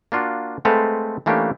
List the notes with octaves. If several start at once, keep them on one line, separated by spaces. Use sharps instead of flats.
A#3 D4 F4 F#4
G#3 A3 C4 A4 B4 F5
E3 A3 A#3 C#4 D4 G4